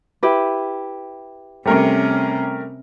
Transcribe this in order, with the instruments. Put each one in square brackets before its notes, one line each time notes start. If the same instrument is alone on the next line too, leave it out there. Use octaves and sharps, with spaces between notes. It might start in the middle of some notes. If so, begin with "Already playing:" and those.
[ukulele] E4 G4 B4
[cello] C3 C#4 [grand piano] G3 A3 A#4